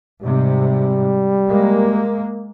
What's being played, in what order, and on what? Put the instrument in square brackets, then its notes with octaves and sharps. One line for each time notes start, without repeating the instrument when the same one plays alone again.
[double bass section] G#2 C3 [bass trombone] G3
[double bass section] G#3 A#3